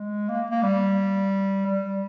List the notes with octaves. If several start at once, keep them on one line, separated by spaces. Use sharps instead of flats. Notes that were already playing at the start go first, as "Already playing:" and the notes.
Already playing: G#3
A#3
A#3
G3
G3